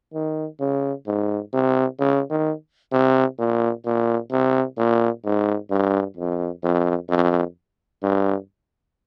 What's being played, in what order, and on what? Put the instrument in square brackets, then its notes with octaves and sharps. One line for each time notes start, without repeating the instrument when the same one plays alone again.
[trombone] D#3
C#3
G#2
C3
C#3
D#3
C3
A#2
A#2
C3
A#2
G#2
G2
F2
F2
F2
G2